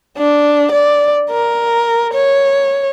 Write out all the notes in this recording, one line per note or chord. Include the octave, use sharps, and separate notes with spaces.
D4
D5
A#4
C#5